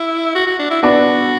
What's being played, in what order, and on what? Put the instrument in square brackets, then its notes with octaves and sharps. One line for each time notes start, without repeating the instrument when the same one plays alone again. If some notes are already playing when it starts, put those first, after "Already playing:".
Already playing: [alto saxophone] E4
F#4
F#4
D4
E4
[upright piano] B3 D4 [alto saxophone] F#4